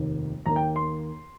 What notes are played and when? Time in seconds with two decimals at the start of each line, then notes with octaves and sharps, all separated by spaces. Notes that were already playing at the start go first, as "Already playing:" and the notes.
Already playing: F1 D#2 D#3 A#3 D#4
0.46 D#2 D#3 A#3 A#5
0.56 G5
0.76 C6